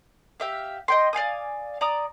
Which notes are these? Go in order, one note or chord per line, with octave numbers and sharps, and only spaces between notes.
G4 E5 F5
D#5 G5 C6
D5 F5 G#5 D#6
D5 A#5 D#6